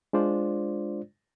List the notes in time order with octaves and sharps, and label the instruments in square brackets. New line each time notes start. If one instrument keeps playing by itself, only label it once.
[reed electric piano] G#3 D4 F4 C5 D5